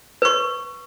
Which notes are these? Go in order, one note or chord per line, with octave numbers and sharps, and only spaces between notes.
B4 C#6